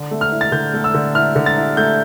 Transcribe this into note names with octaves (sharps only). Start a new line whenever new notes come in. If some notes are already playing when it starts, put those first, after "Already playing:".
Already playing: D3
A3
F6
E4
A6
D3 G6
A3
E6
D3
E4 F6
D3
A6
E4
A3 G6